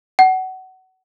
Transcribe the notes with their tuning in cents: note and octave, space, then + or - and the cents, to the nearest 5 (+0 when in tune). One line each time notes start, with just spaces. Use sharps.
F#5 +25